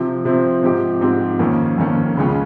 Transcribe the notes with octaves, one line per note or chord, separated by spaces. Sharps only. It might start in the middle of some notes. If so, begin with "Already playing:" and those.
Already playing: C3 F3 C4
C3 F3 C4
G#2 F3 C4 D#4 G4
G#2 F3 C4 D#4 G4
F2 D#3 A#3 C#4
F2 D#3 A#3 C#4
C#2 C#3 G#3 C#4 F4